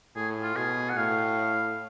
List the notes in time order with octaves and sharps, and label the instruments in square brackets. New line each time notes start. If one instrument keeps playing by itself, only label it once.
[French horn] A2 [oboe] G#4
[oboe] F4
[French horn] B2 [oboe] G#4
[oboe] F#5
[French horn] A2 [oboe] F5